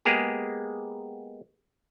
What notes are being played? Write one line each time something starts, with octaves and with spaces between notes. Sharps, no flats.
G#3 A#3 B3 G4 G#4